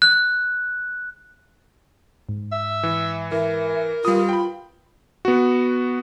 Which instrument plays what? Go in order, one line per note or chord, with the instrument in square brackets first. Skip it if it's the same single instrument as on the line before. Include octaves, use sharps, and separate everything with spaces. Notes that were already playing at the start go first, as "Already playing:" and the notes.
[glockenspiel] F#6
[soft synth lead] G#2
[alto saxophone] E5
[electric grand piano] E3
[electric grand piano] E3 [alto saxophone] A#4 [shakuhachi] E5
[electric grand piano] G3 D#6 [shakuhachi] F4 [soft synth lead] B4
[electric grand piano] G5 B5
B3 F#4